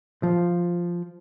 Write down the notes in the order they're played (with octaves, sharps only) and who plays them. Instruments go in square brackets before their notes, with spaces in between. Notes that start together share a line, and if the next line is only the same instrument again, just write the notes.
[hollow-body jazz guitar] F3